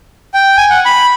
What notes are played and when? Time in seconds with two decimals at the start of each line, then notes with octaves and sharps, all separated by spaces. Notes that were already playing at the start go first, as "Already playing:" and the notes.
0.34 G5
0.57 G#5
0.70 F#5
0.85 B5